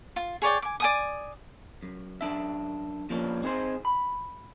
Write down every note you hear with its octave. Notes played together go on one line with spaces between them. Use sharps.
F4
G#4 C#5 D5 G5
G#5 D6
D5 G#5 D#6
F#2
F#2 D4 E5
A#2 F3 A#3 C#4 D4
C4 D#4 G#4 A#4 C5
B5